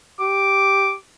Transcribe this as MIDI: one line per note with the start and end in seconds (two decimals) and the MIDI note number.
0.20 0.97 67
0.20 0.98 86